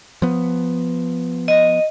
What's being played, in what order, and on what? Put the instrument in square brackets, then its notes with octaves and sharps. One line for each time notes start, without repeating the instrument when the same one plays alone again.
[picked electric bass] F3 B3
[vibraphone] D#5